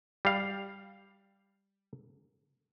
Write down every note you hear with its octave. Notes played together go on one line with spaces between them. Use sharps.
G3 F5